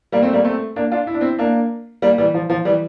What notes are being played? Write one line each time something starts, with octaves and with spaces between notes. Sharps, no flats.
G3 A#3
A3 C4
G3 A#3
A3 C4
A#3 D4
D4 F4
E4
D4
C4 E4
A#3 D4
G3 A#3
E3 G3
F3
F3
E3 G3